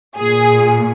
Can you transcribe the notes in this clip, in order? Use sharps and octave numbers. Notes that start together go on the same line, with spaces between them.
A#2 G#4